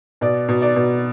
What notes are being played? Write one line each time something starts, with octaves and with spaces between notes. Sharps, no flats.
B2 D5
B2
D5
B2